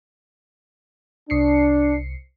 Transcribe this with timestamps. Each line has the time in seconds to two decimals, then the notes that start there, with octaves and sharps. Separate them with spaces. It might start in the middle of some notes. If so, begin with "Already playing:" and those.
1.30 C2 D4 C7 C#7